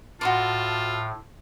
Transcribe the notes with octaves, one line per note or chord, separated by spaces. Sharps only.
A2 F4 F#4 A5 C6 D6